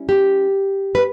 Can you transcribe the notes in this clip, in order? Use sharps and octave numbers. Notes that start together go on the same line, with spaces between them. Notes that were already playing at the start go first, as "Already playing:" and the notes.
Already playing: G3 C#4 E4
G4
B4